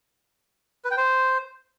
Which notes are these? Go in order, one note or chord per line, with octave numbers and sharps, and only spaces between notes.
B4
G5
C5